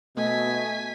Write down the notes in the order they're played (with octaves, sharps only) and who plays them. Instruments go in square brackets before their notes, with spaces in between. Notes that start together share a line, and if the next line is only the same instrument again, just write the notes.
[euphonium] B2 [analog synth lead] A3 [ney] D#5 [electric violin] G#5 B6